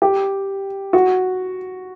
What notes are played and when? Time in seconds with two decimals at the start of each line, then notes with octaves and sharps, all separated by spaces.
0.02 G4
0.93 F#4